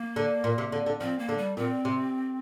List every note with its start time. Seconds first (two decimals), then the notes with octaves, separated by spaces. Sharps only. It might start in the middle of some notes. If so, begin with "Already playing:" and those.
Already playing: A#3
0.16 D3
0.44 A#2
0.58 C3
0.72 D3
0.86 D3
1.01 F3 C4
1.19 A#3
1.29 D3
1.38 G3
1.57 A#2 C4
1.85 C3